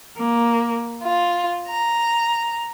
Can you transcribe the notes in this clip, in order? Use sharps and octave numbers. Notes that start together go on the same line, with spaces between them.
A#3
F4
A#5